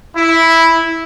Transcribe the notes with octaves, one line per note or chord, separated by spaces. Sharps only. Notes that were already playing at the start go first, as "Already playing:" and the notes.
E4